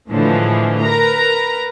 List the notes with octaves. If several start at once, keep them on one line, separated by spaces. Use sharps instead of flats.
A2 D3 E3 F3 G#3
A#4 B4 A#5